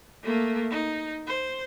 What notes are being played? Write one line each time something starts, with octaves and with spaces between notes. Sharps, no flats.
A3 A#3
D#4
C5